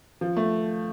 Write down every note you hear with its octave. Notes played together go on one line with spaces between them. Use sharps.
F3
A3